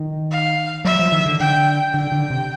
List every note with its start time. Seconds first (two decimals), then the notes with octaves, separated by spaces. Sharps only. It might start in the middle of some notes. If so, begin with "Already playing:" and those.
Already playing: D#3
0.31 F5
0.85 F#3 E5
0.99 F3
1.12 D#3
1.26 D3
1.40 D3 G5
1.94 D3 G5
2.12 D3
2.30 C3